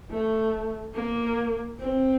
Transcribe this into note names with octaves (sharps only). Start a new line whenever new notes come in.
A3
A#3
C4